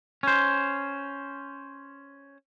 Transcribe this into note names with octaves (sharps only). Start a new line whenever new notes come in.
C#4 C5